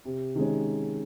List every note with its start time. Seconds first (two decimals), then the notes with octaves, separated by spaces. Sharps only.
0.05 C3
0.35 D#3 G#3 C#4